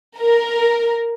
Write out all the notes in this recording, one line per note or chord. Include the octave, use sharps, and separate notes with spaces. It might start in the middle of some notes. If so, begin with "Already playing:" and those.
A#4